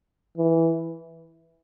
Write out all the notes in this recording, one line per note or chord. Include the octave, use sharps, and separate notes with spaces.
E3